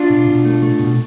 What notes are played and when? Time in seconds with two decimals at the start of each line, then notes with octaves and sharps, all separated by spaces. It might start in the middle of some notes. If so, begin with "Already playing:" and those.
Already playing: D4 F4
0.10 B2
0.28 B2
0.45 A3
0.62 A3
0.79 B2